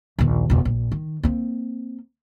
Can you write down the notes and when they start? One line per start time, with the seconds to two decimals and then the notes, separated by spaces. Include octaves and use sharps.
0.19 A#1 D#2
0.50 E1 B2
0.65 A#1
0.92 D#3
1.23 A#3 C4